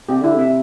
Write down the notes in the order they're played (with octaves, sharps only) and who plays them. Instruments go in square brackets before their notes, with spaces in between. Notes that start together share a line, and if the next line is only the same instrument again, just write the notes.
[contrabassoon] C3 [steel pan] G4
[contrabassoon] D3 [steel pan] E4
[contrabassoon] C3 [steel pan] E5